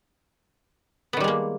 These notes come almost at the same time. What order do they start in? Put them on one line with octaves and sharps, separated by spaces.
B3 D#3 G3 G#3 A#3